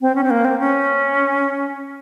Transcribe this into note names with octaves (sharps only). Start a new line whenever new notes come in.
C4
C#4
C4
A#3
C4
C#4